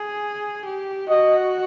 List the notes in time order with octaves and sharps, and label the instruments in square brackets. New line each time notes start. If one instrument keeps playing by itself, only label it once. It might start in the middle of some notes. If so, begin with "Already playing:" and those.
Already playing: [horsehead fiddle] G#4
G4
[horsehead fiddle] F#4 [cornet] D#5